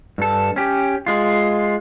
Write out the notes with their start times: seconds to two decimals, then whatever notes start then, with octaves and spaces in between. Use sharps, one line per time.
0.18 G2 A4
0.56 C#4 G4
1.06 G#3 F4